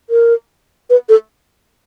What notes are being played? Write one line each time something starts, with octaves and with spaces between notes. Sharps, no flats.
A#4
B4
A4